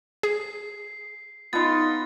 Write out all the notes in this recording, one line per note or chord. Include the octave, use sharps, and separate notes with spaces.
G#4 C7
B3 D#4 F4 A6